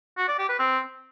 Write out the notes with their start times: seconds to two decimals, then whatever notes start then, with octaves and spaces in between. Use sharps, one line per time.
0.17 F#4
0.28 D5
0.38 G4
0.49 B4
0.59 C4